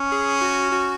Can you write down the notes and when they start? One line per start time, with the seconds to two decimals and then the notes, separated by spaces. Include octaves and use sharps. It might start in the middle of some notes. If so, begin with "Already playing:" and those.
Already playing: C#4
0.12 G#4
0.41 F#4
0.72 F#4